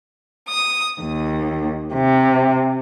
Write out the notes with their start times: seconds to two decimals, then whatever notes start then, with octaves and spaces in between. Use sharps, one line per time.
0.48 D#6
1.02 D#2
1.94 C3